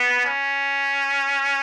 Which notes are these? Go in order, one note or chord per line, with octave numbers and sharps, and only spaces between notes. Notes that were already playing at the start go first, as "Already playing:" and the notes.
Already playing: B3
C#4